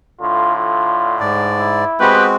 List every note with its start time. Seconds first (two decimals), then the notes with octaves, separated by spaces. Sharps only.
0.21 A2 D3 F4
0.56 F4
1.20 G#2 D5
1.59 E4
2.00 G#3 B3 C4 F#4 G4 B4